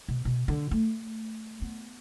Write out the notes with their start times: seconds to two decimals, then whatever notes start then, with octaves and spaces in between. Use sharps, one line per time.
0.08 B2
0.25 B2
0.48 D3
0.71 A3
1.62 B3